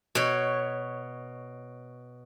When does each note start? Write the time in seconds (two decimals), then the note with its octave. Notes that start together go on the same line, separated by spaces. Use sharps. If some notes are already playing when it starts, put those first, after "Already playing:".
0.15 B2 C#5